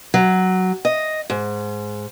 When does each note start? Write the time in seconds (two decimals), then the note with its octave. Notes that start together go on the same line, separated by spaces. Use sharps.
0.14 F#3
0.85 D#5
1.30 G#2